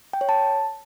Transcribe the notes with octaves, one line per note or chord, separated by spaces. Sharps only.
G5
C#5
A5